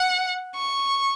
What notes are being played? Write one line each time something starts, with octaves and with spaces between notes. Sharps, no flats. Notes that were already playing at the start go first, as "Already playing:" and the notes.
Already playing: F#5
C#6